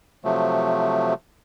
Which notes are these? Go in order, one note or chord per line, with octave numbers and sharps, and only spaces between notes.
C3 F3 F#3 A3